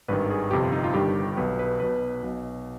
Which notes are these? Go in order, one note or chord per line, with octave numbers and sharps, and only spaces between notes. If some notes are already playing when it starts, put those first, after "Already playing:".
G#1 G2 D#3 B4
G#4
G1 F2 C3 G4
F4
D#4
F4
G1 G2 D#3 G4
B1 B2 B4
B4
B1 B2 B4
B1 B2